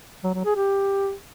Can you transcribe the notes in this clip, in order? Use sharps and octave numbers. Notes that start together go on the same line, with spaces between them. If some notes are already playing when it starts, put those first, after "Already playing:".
F#3
F#3
G#4
G4